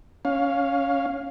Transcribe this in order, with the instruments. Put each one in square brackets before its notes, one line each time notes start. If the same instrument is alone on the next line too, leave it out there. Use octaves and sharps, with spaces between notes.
[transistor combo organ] C#4 F5